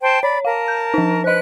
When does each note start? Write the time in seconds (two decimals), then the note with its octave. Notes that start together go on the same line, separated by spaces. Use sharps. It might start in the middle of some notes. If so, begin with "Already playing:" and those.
0.01 C5 G5 A5
0.23 C#5 D5 B5
0.45 A#4 F5 A5
0.68 G6
0.94 F3 D#4
1.24 B4 C5 D#5 F#6